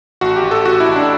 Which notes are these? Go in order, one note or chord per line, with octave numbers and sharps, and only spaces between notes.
A1 F#4
G4
A1
A4
A1 F#4
E4
A1
D4